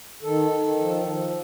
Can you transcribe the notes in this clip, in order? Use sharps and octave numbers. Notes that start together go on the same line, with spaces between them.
D#3 A4
D#3
F3
F3